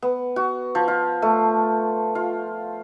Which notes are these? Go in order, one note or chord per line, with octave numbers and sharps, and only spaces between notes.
B3
F#4
F3
F4
A3
F4